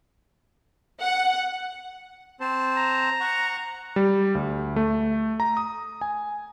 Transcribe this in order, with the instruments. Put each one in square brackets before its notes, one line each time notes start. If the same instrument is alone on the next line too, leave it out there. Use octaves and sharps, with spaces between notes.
[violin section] F#5
[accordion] C4 C5 A5
[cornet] A#5
[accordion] F#5 C#6
[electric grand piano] G3
D2
A3
A#5
D#6
G#5